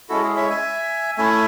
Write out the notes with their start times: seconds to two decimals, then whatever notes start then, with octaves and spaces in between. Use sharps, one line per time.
0.09 G#3 C#4 E4 F#4 A4
0.23 G#4
0.37 C#5 E5
0.50 E5 G#5
1.17 A3 C#4 E4 E5 G#5